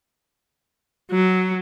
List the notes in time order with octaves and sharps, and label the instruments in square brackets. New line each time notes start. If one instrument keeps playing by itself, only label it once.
[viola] F#3